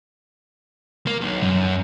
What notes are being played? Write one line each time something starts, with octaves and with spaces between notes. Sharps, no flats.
A#3
B1
F#2